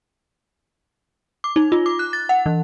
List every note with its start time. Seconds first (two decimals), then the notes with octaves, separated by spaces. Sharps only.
1.44 D6
1.56 D#4
1.72 F4
1.86 D6
1.99 F#6
2.13 A6
2.29 F#5
2.46 E3